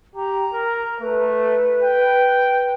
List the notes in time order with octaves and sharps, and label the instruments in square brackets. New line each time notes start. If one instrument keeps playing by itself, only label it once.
[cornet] G4 [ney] A#5
[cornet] A#4
[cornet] A3 [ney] B4
[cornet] G5